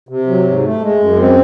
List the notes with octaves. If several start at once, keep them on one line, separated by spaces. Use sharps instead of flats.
C3
F#3
G#2
A3
G#3
F#2
C4